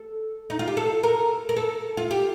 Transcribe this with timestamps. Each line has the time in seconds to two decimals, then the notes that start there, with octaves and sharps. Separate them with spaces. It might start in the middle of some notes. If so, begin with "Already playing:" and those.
Already playing: A4
0.50 D#4
0.59 F4
0.68 G4
0.77 A4
1.03 A#4
1.49 A#4
1.57 A4
1.97 F4
2.11 G4